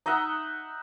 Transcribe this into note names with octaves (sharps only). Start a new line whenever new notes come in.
D#4 D#5 E5 F#5